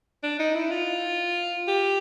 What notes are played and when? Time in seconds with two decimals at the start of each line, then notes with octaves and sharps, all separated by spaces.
0.23 D4
0.39 D#4
0.55 E4
0.72 F4
1.68 G4